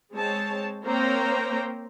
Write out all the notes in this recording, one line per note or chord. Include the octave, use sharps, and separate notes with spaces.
G#3 C4 C#5 A5
A#3 C4 C5 C#5 G5 A#5